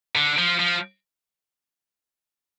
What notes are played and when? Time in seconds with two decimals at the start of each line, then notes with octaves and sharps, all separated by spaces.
0.16 D3
0.38 F3
0.59 F3